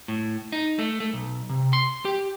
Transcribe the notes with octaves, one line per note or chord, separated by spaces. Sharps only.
A2
D#4
A3
A3
B1
C3
C6
G4